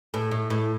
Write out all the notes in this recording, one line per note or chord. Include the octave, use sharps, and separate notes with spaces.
A2
A2
A2